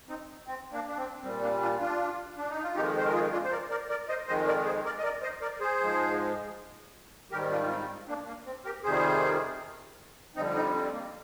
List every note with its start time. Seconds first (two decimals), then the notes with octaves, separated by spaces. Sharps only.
0.09 C4 D#4
0.47 C4
0.72 A#3 D4
0.88 D4
0.97 C4
1.23 A#2 G3 C4
1.42 A#3 D4
1.61 D4 F4
1.80 D4 F4
2.38 D4
2.50 D#4
2.63 F4
2.75 F2 D#3 G#3 D#4 G4
2.97 C5
3.05 A#4
3.13 F4 G#4
3.32 D4 F4
3.44 C5
3.51 A#4 D5
3.70 A#4 D5
3.89 A#4 D5
4.09 C5 D#5
4.27 F2 D#3 G#3 C5 D#5
4.47 A#4 D5
4.65 G#4 C5
4.85 A#4 D5
4.99 D#5
5.03 A#4 D5
5.22 C5 D#5
5.41 A#4 D5
5.60 G#4 C5
5.80 G#2 F3 G#3
7.32 G#2 D#3 G3 G4 A#4
7.51 D4 F4
7.65 F4
7.70 C4 D#4
8.08 A#3 D4
8.27 A#3
8.46 C4
8.65 G4 A#4
8.84 F2 C3 D#3 G3 G#4 C5
10.36 F2 D3 G3 C4 D#4
10.55 C4 D#4
10.74 C4
10.93 A#3